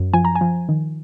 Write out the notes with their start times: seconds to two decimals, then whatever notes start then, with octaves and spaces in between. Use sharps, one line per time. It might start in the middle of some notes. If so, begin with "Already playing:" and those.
Already playing: F#2
0.13 F3 G#5
0.25 A#5
0.35 G#5
0.41 F3
0.69 D#3